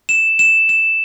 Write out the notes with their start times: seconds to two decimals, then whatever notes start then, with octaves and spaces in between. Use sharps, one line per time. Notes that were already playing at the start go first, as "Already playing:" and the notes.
0.09 E7
0.39 E7
0.69 E7